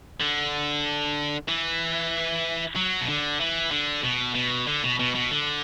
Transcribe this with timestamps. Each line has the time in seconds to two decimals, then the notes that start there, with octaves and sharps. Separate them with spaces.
0.20 D3
1.48 E3
2.76 F#3
3.01 B2
3.08 D3
3.40 E3
3.71 D3
4.04 B2
4.35 B2
4.67 D3
4.84 B2
4.99 B2
5.15 B2
5.31 D3